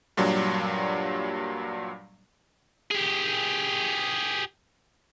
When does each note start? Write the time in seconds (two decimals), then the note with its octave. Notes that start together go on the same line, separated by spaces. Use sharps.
0.17 G2 A#2 F#3 G3 D4
2.91 G4 G#4